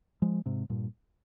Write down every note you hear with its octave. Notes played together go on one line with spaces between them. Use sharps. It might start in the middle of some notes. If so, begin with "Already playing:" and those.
F3 G#3
G#2 C3
G2 A#2